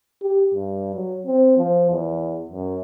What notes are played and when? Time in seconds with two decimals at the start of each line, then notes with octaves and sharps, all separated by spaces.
0.22 G4
0.55 G2
0.95 F#3
1.27 C4
1.58 F3
1.91 E2
2.51 F#2